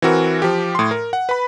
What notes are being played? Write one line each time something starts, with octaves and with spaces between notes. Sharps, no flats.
E3 C4 F#4 A#4
F3 G4
A2 C6
A#4
F#5
B4 B5